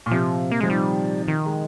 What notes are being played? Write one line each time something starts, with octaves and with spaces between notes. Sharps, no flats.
A#2
C3 F3
A#3
F3 G#3
D#3 G3
D#3
G#3